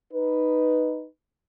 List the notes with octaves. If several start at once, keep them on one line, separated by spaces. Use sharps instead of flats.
D#4 B4